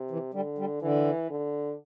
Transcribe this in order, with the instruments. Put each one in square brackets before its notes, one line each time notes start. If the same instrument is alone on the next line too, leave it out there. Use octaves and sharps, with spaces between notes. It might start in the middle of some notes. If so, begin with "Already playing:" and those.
Already playing: [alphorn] C3
[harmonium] E3
[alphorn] D3 [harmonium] G3
[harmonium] G3
[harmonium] D3 [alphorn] E3
[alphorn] D3